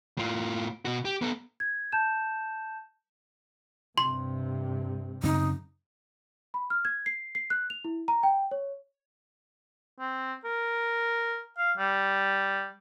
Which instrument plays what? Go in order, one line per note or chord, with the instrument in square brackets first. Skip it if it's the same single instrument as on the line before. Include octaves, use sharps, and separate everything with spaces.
[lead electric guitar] A2 F4
B2 F#4
G4
B3 A4
[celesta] G#6
A5 G6 E7
[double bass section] G2 C3 [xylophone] C6
[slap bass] F#2 C#3 C4 [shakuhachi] D#4
[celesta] B5
F6
G#6
C7
C7
F#6
F7
E4
A#5
G5
C#5
[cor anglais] C4
A#4
F5
G3